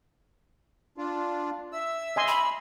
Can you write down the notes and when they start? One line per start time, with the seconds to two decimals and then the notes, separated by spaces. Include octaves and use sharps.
0.97 D4 F4
1.72 E5 E6
2.16 D#5 G#5 C6
2.28 B5